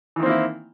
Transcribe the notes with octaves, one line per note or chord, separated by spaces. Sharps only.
D#3 E3 A#3 C4 E4